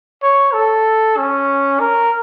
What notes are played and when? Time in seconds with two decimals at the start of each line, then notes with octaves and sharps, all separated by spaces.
0.23 C#5
0.53 A4
1.18 C#4
1.80 A#4